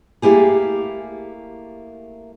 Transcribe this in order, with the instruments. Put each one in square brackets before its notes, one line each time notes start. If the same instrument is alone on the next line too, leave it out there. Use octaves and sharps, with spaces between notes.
[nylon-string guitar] A3 A#3 E4 G4 G#4